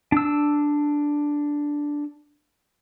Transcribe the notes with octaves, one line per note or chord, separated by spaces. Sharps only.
D4 E6